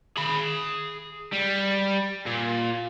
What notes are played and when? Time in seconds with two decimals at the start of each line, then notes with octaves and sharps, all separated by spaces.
0.17 G#4 B5
1.33 G3
2.26 A#2